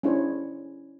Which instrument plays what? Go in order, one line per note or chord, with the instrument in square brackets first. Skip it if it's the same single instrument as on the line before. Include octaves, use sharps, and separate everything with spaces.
[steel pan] C#4 D4 E4 G#4 C5 C#5